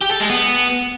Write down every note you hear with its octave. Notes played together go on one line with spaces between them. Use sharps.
G4
A4
G#3
B3